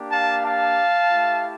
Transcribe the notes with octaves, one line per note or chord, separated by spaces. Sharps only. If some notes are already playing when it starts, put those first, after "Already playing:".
Already playing: A#3 D4 G4
F5 A5
F5 A5
A3 E4 G4